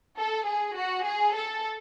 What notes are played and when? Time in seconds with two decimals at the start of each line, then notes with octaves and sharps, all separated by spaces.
0.17 A4
0.46 G#4
0.75 F#4
1.04 G#4
1.33 A4